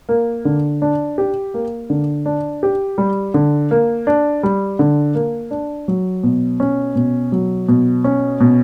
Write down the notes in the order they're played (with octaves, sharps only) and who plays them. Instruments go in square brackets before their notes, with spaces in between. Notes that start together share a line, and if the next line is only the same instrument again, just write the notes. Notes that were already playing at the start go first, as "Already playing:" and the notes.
[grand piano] A#3
D3
D4
G4
A#3
D3
D4
G4
G3
D3
A#3
D4
G3
D3
A#3
D4
F#3
B2
C#4
B2
F#3
B2
C#4
B2